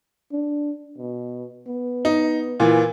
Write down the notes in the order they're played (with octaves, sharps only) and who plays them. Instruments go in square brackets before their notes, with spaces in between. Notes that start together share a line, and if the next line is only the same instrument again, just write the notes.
[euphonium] D4
B2
B3
[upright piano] D#4
A#2 E3